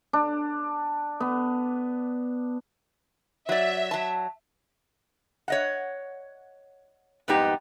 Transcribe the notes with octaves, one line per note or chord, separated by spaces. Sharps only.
D4
B3
F#3 D5 E5
F#3 A5
C#5 D#5 F#5
F2 G#2 G3 B3 D#4 G4